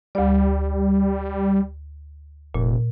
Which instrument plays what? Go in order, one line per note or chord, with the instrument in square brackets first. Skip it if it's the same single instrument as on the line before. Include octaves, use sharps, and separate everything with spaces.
[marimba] D2 D5 [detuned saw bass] G3
[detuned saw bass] F1 [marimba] A#2